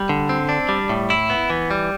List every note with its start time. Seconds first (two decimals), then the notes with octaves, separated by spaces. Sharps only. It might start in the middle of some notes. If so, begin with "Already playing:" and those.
Already playing: G3
0.09 D3
0.29 C4
0.49 D4
0.69 G3
0.89 A2
1.10 E4
1.30 B3
1.50 E3
1.71 G3